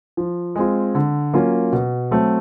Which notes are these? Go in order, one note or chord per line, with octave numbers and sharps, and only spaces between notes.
F3
G#3 C4 F4
D3
F#3 A#3 C#4 F4
B2
F#3 A3 C4